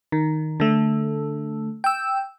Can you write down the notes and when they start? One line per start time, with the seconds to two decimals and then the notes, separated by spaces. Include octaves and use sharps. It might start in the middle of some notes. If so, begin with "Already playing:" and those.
0.12 D#3
0.60 D3 A3
1.84 G5 E6